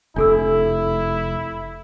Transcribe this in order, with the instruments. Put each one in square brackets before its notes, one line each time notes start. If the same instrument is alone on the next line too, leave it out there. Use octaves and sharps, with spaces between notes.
[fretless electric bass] F1 [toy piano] D4 A4 E6 [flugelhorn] E4